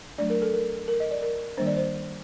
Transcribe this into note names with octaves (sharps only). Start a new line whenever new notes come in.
F#3 A3 D4 D5
A#4
A4
A#4
A#4
D#5
D5
A#4
D#3 G3 A#3 D4 C5
D5
C5